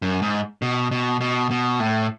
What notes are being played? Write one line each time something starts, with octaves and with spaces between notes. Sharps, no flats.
F#2
G#2
B2
B2
B2
B2
A2